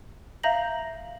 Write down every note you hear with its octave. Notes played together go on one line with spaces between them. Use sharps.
E5 F5 A#5 G6 A#6 F#7